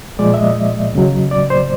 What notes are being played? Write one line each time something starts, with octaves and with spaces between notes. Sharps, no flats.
A#2 F3 G#3 D5
E5
D#5
D#2 C#3 F#3
D5
C5